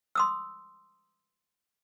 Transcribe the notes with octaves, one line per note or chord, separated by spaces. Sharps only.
C6 D#6 E6